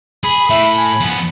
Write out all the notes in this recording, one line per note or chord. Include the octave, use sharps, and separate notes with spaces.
G#4 B5
A2 E5
G#5
F3 B3